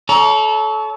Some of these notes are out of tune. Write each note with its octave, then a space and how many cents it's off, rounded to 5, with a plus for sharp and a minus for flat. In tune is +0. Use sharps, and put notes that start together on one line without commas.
A4 -25 C#5 +25 A#5 +20